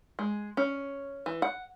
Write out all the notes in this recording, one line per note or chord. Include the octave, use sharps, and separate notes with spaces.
G#3
C#4
E3
F#5